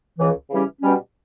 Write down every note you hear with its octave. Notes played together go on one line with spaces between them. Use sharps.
C#2 C#3 E3
C#3 E3 G3 C#4 G4
B2 G3 C#4